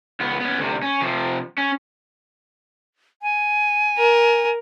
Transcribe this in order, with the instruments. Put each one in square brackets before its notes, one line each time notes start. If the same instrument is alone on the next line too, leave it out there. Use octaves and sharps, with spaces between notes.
[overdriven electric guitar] C#2 B3
B3 C#4
D2 C3
C#4
C3 F3
C#4
[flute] G#5
[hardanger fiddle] A#4